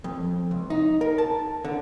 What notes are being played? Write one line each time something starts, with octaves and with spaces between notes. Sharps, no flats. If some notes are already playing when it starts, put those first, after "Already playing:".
F2
C#2
D#4
A#4
A5
D3